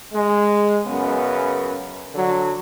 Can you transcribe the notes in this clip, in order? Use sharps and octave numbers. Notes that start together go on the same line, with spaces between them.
G#3
F#2 C#3 B3
D3 F#3